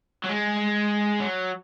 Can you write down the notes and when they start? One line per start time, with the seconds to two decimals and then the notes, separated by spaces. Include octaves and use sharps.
0.24 F#3
0.29 G#3
1.20 F#3